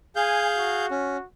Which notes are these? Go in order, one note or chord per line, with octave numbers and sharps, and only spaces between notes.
G#4 F5 G#5 G6
F#4
C#4